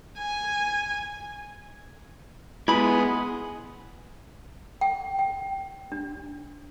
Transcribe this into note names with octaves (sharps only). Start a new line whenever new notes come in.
G#5
G#3 B3 E4 B5
G5
G5
D4